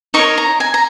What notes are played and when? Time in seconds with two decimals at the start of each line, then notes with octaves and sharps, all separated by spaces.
0.14 D#4 A#4 C#5 C#6
0.38 A#5
0.60 G#5
0.74 A#5